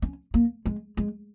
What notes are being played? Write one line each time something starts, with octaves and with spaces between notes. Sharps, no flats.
C#4
A#3
G#3
G#3